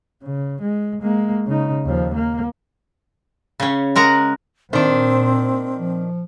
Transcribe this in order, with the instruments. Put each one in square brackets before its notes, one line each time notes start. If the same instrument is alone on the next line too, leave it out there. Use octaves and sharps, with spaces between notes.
[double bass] C#3
G#3
G#3 A#3
C#3 D#4
D#2 F3
A#3
[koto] C#3 C#4
G#3 A#4 F#5 A#5
[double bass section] A#2 [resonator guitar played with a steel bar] D#3 D4 [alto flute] C4 [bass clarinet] C5
[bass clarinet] F3